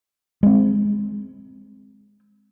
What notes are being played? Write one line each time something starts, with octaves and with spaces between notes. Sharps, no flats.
G#3 C4